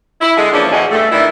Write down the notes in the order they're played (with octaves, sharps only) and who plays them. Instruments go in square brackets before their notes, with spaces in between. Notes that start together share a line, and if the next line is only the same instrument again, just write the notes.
[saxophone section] E4
D3 G#3 G#4
E3 F3 A#3 C#4 D4
E2 A2 E3 F#4 G#4 D#5
G2 A3
D#3 E3 D4 E4